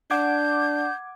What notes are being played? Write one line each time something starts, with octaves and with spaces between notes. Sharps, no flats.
D4 F#5 D6 G6 G#6